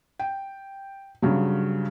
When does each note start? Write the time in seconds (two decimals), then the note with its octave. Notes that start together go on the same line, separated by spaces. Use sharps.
0.19 G5
1.22 G2 C#3 F#3